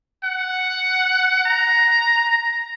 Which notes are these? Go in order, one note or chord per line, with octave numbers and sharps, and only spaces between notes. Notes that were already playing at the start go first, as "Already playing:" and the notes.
F#5
A#5